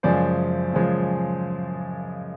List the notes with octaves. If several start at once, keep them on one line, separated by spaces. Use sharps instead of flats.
F#2 C#3 F3 G#3 C5 D5
F#2 C#3 F3 G#3